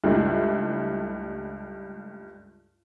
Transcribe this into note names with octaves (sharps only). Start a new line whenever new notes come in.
C#2 G2 A3 D4 E4